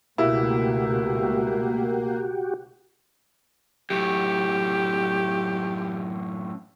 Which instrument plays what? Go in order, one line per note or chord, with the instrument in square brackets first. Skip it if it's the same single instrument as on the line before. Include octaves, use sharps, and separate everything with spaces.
[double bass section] C#2 B2 A3 [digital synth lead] A#3 [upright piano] E4 [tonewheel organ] F#4 G4
[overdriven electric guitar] F#2 A2 [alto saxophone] G4